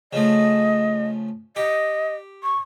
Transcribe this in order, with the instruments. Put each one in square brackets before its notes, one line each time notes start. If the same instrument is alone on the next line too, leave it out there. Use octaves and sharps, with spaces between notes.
[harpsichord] C#3 F3 A3 [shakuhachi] D#5
[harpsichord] G4 [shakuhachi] D#5
[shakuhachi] C#6